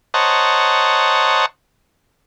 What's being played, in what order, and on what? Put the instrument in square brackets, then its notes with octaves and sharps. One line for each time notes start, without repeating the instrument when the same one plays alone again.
[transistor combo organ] C5 C#5 D#5 F#5 A5 A#5